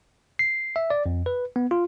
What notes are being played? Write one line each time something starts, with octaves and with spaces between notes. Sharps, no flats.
C7
E5
D5
F2
B4
B3
F4